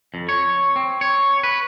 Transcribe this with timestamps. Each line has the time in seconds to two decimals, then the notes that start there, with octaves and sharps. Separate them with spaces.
0.14 F2
0.29 C#5
0.76 C4
1.01 C#5
1.43 B4